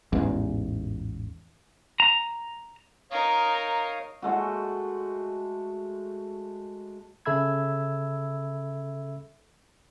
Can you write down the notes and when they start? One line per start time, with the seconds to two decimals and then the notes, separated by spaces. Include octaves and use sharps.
0.13 A1 E2 G#2
2.00 A#5
3.11 D#4 A#4 C#5 F5 D#6
4.22 G#3 A3 F#4
7.26 C#3 A4 E5 B5 E6 G#6